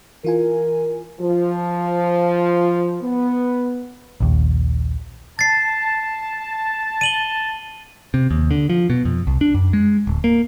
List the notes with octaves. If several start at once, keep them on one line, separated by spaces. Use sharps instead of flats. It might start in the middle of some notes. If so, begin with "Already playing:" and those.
E3 F4 A#4 G#5
F3
B3
A#1 D#2
A5 A6 C7
D#7 F#7 G7
C3
D#2
D3
F3
B2
F2
C2
D4
F#2
G#3
D1
A#3